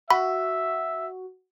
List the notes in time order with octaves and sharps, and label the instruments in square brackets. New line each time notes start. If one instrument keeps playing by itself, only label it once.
[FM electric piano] F#4 [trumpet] E5 [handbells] B5